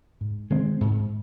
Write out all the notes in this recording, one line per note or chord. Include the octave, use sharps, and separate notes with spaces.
G#2
D#3 G#3 C4
G#2